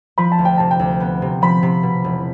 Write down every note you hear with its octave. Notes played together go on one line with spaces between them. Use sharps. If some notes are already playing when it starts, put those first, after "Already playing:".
F3 B5
A5
D2
G5
C3 A5
G5
D2
B3
C3
F3 B5
C3
B2
E1